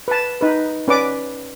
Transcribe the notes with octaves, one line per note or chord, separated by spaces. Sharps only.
B4 A5
D#4 B4
C#4 B4 D5 D6